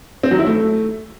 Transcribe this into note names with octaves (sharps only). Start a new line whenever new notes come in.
C4
F#3
E4
A3